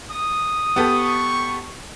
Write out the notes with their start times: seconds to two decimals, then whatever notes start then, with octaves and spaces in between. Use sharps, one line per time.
0.10 D#6
0.76 B3 G4 A4 C#6